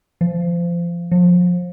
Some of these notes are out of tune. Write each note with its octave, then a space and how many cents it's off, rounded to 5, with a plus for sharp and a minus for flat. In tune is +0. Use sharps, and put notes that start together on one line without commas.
F3 -25
F3 +30